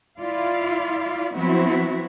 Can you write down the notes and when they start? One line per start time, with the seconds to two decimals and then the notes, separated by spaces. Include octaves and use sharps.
0.19 E4 F4 D5 F5
1.36 F3 F#3 B3 C4 E4 F#4